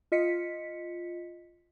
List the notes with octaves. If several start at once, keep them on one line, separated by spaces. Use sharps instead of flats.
F4 D#5 B6 C#7